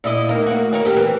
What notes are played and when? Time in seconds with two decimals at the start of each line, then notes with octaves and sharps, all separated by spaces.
0.04 A#2 E4 D#5
0.29 D#2 A#3
0.46 A#3 F#4
0.72 D#3 A#4 C#5
0.85 C4 G4 A#4
0.96 E3